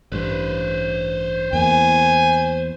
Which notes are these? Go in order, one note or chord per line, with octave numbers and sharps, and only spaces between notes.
A1 G2 B4 C5
E2 A#3 G#5